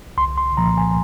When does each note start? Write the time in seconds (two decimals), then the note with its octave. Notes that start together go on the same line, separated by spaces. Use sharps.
0.17 C2 C6
0.38 C6
0.57 A#2 F3 A#3 A#5
0.77 G#5